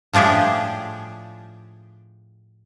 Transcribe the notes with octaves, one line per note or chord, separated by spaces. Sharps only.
A2 F3 D4 G4 G#4